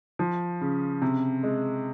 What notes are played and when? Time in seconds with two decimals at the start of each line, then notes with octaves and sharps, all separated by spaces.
0.19 F3
0.61 C#3
1.02 C3
1.43 G#3